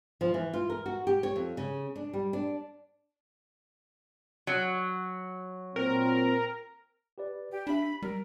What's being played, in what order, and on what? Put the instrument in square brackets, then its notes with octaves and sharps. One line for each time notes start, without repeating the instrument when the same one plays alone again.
[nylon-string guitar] F3
E3
F4
A#4
F#4
G4
C#5
F2
C#3
D4
G3
D4
[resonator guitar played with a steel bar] F#3
[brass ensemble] A#2 C4 [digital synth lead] A#4
[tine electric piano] G4 B4 D5
[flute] G4
[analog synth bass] D4 [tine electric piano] G4 E5 [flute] B5
[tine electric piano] B6
[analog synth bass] G3 [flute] A#4